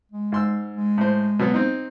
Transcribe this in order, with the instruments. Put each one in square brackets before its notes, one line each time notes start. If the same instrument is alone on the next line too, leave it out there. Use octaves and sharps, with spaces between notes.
[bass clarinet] G#3
[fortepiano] G#2 C6 E6
[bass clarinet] G#3
[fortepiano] A2 C5
B2 F#3 B3
C4 D#4